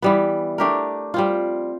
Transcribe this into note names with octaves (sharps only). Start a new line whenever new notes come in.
E3 G3 B3
A3 D4 G4 A#4
G3 C4 F4